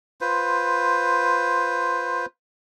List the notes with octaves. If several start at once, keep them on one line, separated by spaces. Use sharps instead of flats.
F4 B4 C5